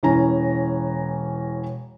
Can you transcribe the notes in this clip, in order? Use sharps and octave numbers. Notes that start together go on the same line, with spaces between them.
E1 E3 C#4 G#5 A#5